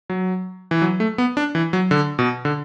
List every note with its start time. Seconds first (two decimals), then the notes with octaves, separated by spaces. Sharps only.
0.10 F#3
0.71 E3
0.82 F#3
1.00 A3
1.18 B3
1.37 D4
1.55 E3
1.73 F#3
1.91 D3
2.19 B2
2.45 D3